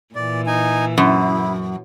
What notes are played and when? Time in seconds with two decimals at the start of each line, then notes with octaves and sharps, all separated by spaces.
0.15 A#2 E3 D5
0.47 D#4 G#5
0.98 F#2 E4